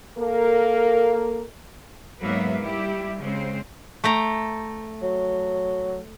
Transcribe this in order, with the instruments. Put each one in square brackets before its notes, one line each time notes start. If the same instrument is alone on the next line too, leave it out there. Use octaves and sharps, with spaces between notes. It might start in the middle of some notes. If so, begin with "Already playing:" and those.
[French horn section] A#3 A4 A#4
[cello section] G#2 F#3 A#3 B3 B4 E5
G3 E4 G4
C#3 G#3 C4 C5
[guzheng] A3 G5 A#5
[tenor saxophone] F#3